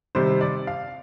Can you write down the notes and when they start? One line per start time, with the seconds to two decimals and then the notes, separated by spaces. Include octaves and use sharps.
0.15 C3 D#3 G3 C5
0.41 D5
0.67 F5